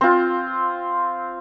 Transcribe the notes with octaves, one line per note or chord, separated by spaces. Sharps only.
C4 F4